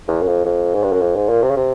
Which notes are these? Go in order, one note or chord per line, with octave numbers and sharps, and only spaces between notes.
E2
F#2
F2
F2
G#2
G2
F#2
F2
G#2
A#2
C3
C#3
C3